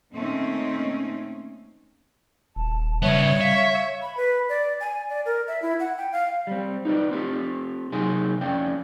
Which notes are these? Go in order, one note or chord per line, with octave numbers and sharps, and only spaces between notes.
A#2 D#3 A3 C4 C#4 D#4
D#1 A5
C#3 G3 B3 C#5 E5
E5 F5
B5
B4
D5
G#5
D5
A#4
E5
E4
F#5
G5
F5
G3 C4
D#4 F4 B4 C5 D5
C4 F4 G4 A4
C3 F#3 D#4 G#4 G#5 C6
F2 C#4 D5 F5 G5